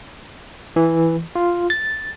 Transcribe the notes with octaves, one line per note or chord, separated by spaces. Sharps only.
E3
F4
A6